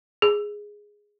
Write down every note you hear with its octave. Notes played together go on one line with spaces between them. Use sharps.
G#4